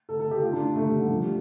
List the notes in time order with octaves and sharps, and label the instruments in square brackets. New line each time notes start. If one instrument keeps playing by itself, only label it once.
[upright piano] A4
A4
G4
F4
D4
A3
G3
D3
F3
G3